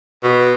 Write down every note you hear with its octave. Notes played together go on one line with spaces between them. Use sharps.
B2